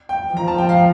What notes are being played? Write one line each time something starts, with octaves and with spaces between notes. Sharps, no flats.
G5
F3 A#5
A5
G5
F5